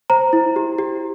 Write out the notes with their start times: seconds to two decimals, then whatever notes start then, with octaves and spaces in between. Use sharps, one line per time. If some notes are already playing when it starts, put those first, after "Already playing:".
0.10 C5 A#5
0.33 E4
0.56 G4
0.78 G4